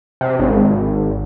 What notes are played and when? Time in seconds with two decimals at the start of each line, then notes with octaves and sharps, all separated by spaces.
0.21 C3
0.39 G#1